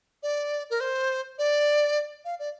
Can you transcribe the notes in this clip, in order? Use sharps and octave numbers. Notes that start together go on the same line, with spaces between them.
D5
A#4
C5
D5
F5
D5